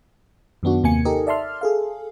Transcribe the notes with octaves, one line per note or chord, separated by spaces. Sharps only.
F#2 D#3 B3 D4 F#4
D#2 C3 A#3 G#5 C#7
D#4 G4 A4 A#4 D#5
D5 E5 A5 C6 F6
G#4 A4 F5